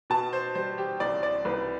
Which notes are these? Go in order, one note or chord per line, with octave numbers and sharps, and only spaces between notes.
B2 A5
C5
G3 C5
G4
C2 D5
D5
C2 B4